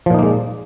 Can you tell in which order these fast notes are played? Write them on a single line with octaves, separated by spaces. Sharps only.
F3 A#2 D#4 A#3 G#3